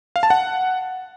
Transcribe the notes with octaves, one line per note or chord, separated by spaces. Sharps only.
F5
A5
F#5